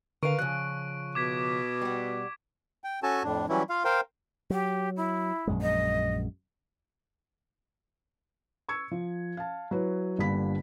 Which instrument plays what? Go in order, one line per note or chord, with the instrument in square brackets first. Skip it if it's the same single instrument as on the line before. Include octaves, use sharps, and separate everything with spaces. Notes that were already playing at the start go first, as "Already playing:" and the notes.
[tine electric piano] D3 [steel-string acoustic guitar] A#4 B4 F5 [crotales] C#6 D7
[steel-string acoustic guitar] C#3 F3 [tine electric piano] F#6
[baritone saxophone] B2 [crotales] D6 G#6 B6
[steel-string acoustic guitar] G3 F#5
[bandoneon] G5
C#4 F#4 A4 G#5 A5
F2 A2 D4
E3 F#3 G3 C#4 E4
F4 F5
A#4 C5 F5 G5
[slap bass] F#3 [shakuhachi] G4
[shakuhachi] E4
[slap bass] A#1 F#2 G#3
[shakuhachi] D#5
[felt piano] C#6 E6 G#6 C#7
F3
F5 A5
F#3 E4 B4 C#5
G1 D3 G3 A#3 B5 B6